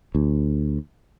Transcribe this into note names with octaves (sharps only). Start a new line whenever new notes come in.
D2